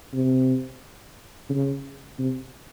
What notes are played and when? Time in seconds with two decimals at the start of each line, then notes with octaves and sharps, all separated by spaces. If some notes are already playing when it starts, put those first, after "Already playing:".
0.13 C3
1.50 C#3
2.19 C3